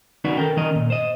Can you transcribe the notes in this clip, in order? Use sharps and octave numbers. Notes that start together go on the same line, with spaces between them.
D#3 C#4 D#4 F#4 B4 D5
A4 A#4 G5
D#3 C#4 A#4 D#5
A#2
C5 D#5